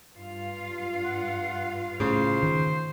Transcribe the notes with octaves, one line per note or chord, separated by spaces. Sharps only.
G2 F4 F5
F#5
A2 C#3 C5
D#3